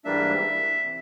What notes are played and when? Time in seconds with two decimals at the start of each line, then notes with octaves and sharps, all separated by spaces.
0.05 G#2 E3 G3 A#3 D4 E5
0.84 C3 E3